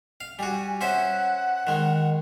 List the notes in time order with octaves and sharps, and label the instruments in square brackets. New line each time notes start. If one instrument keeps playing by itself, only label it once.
[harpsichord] F5
[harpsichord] G3 F#4 [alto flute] G#5
[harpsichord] C#4 C5 E5 [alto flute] F#5
[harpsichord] D#3 G#3